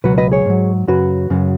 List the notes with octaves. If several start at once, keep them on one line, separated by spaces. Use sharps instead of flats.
C#2 B2 F#3 F#4 B4
B4 D#5
G#4 C#5
G#2 F#3
F#2 C#3 F#3 F#4 B4
F#2 C#3 F#3